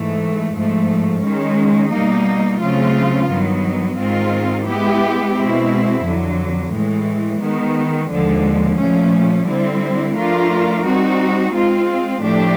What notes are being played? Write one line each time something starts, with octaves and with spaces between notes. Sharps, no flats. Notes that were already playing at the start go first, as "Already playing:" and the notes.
Already playing: G#2 E3 A3
G#2 F3 A3
D#3 G#3 C#4
B2 G3 A#3 D#4
C#3 F#3 A3 C4 F4
G2 D#3 F#3 B3
G#2 D#3 G#3 C4 F4
G#3 B3 E4 G4
B2 G#3 C4 E4
F2 D3 F#3
A2 E3 G#3
D#3 G#3 B3
D#2 D3 F3 G#3
A#2 F3 A3 C#4
D3 G3 C4 E4
F3 A3 D4 F4 A#4
G3 C4 D#4 F#4
G#3 C4 F4
A2 F3 A3 D4 G4